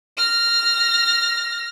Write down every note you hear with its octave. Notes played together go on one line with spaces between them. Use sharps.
F6 A#6